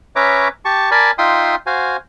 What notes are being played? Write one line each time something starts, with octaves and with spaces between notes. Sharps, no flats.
C#4 B4 C#5 E5 A#5 D6
G4 A5 C#6
A#4 D5 G#5 A5 B5
D#4 F4 E5 G5 C6 D#6
F#4 C5 F5 G#5